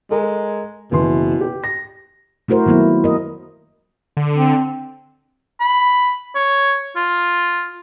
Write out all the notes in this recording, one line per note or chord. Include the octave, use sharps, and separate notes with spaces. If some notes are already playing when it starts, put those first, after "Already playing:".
G#3 A4 A#4 A#5
F#1 B2 E3 C6
G4
A#6
A3 E4 F#4 A#4 C5
D#3 F#3 A#3 B3 E4
A#4 D#5
D3
C4
B5
C#5
F4